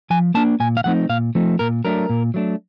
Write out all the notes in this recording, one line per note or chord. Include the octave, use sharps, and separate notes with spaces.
F3 G#5
A#3 D4 A5
A#2 G#5
F5
F3 A3 C4 D#4 F#5
A#2 F5
F3 A3 C4 D#4
A#2 A#4
F#3 A3 D4 A#4
A#2
F#3 A3 D4